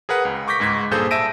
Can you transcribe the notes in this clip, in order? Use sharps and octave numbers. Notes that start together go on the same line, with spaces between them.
G#4 A#4 B4 F#5
C#2
C#6 D6 G6 A#6 B6
C#2 G#2 G#6 B6
G2 A#2 G#4 A4 C5 G6
E5 A5 E6 A#6 D7 D#7